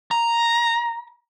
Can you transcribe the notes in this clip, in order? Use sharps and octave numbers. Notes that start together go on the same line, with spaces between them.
A#5